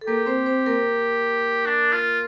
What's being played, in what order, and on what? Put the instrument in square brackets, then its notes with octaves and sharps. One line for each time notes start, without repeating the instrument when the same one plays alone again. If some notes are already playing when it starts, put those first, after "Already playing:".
[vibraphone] A4
[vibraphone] A#3 A#4 [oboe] G4
[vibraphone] C4 C5
C4 C5
A#3 A#4
[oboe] D4
F4